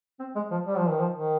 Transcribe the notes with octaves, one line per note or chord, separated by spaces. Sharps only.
C4
G#3
F3
G3
F3
D#3
F3
D#3